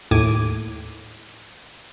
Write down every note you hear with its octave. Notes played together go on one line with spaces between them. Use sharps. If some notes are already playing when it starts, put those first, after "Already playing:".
D#2 A2 D6 G#6 D#7